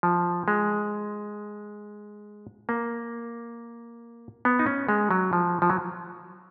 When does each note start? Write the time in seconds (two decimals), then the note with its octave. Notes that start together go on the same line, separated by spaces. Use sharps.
0.03 F3
0.48 G#3
2.69 A#3
4.45 B3
4.59 D#4
4.66 C#4
4.89 G#3
5.11 F#3
5.33 F3
5.62 F3
5.70 F#3